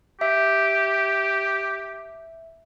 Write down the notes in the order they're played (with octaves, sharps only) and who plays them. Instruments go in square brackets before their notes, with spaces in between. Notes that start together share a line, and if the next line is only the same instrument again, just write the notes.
[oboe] G4 [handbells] E5